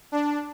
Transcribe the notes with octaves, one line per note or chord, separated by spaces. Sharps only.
D4